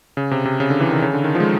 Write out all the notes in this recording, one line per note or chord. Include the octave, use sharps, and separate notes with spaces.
C#3
C3
C3
C#3
D3
E3
D#3
C#3
D3
D#3
F3
G#3